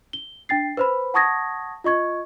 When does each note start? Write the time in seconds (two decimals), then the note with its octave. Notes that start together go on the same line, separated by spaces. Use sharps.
0.13 G7
0.49 D4 G5 A6 C7
0.77 B4 C5 B5
1.14 F#5 A5 C#6 D#6 G#6 A#6
1.84 F4 D#5 C#6 G#6